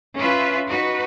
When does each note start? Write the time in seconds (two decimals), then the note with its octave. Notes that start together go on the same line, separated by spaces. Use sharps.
0.16 C#4 F4 B4 E5
0.68 D#4 F#4 B4